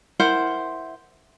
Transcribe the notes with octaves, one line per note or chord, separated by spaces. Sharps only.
E4 A#4 C5 F#5